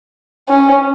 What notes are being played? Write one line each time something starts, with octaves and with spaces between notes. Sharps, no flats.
C#4